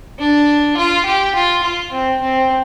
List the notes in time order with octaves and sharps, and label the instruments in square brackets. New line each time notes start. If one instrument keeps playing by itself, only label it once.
[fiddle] D4
F4
G4
F4
F4
C4
C4